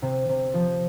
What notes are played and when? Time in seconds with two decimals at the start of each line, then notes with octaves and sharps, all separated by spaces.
0.02 C3
0.29 C3
0.54 F3